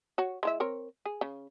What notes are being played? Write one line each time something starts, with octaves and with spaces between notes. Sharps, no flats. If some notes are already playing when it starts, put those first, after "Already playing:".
F#4 C#5
G#3 E4 E5
C4 A#4 C#5
G#4
C#3